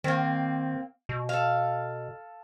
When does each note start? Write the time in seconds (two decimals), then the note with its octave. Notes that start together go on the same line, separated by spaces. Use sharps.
0.04 D#3 A#3 C4
1.09 B2
1.29 A4 F5